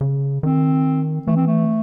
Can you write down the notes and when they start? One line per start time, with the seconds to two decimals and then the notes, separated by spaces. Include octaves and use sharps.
0.01 C#3
0.43 D#3 C4
1.27 E3 A3
1.36 C4
1.46 A3